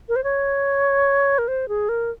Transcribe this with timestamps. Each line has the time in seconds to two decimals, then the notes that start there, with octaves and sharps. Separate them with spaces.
0.09 A#4
0.16 C5
0.24 C#5
1.38 A#4
1.48 C5
1.69 G#4
1.89 A#4